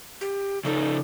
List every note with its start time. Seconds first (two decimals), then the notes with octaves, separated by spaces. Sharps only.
0.21 G4
0.65 C#3 F3 D#4 A4